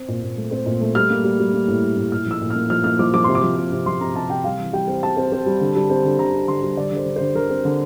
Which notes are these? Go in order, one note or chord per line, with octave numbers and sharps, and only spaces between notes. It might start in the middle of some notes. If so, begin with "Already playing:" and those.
Already playing: C4
A#2
A#2
A3
C4
A#2
A3
G3 F6
A#3
G3
G3
A#3
A2
G3
A2
A#2 F6
F3 E6
A#2
F6
A#3
F3 F6
A#3 F6
F3 D6
F3 D6
C3 C6
D6
F3
C3
C3
F3 C6
C3 A#5
C3 A5
C3 G5
G3 F5
E3
G3 G5
C4
G3 A5
C4
C4
G3
D3
G3
C4
D3
D3 A#5
C4
D3 C6
G3
D3 D5
D3 C5
D3
D3 C5
D3 A#4
C4
D3